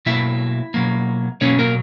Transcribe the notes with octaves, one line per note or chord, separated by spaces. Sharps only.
B2 F#3 A#3 E4 E5
B2 F#3 A#3
B2 F#3 A#3 C#4 C#5
A#3 A#4